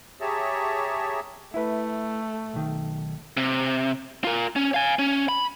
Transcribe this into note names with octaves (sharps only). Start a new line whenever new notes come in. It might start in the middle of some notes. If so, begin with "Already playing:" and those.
G4 G#4 C#5 E5 A5 A#5
A3 E4 B4
B1 D#3
C3
F4 A#4
C#4
F5 G#5
C#4
B5